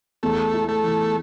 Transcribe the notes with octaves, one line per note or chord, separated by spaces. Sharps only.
E2 A3
E4
A3
E3